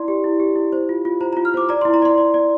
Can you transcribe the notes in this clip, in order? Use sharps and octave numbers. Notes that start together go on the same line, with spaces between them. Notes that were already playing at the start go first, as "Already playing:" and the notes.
Already playing: E4 D5 C6
G4
E4
G4
E4
C5
F4
F4
C5 A#5
A#5
F4
F6
C5 D6
D5 A#5
C6
E4
A#5
D5 C6
D5
D5